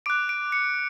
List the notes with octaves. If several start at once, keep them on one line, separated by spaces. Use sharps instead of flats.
D6 F#6 D7
D7
C#7